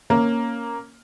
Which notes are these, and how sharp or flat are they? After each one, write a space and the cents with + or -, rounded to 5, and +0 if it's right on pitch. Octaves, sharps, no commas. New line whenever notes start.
A#3 +0 C#4 -5